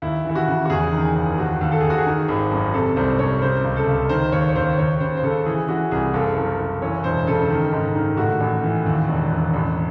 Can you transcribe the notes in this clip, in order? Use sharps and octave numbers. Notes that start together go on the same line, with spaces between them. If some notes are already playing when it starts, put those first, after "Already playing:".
D#2 E4
E3 E4
F#4
C#3
F#4
E2 G#4
D#3
F#1
D#2 F#4
D#2
A4
D#2 G#4
F#4
G#4
D#3
G#1
F#2
C3 A4
C2 C5
C3 C#5
C#3 C5
C#2
A4
C#2
D#3 C5
D#2 C#5
C#5
D#2 C5
D#2 C#5
C#3 C5
C5
C#3 A4
E3 G#4
E3 F#4
C2 G#4
F#1 A4
F#2
F#1
E3 C#5
E1 C5
C#3 A4
D#3
G#2
D#3
A2 F#4
A1
E3
D#2
E1
E1
A1